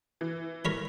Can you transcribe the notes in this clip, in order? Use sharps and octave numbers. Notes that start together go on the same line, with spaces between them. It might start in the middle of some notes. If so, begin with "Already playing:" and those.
E3
A#4 C#5 B5